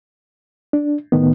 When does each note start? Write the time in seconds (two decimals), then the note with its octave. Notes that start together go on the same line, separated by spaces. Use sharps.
0.73 D4
1.12 A2 D#3 B3